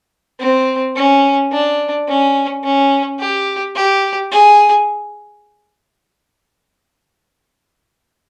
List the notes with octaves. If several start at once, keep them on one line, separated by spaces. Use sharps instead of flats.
C4
C#4
D4
C#4
C#4
G4
G4
G#4